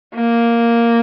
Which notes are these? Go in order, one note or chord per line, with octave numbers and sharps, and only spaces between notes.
A#3